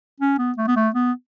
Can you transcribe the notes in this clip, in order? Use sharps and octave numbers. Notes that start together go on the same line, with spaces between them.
C#4
B3
A3
B3
A3
B3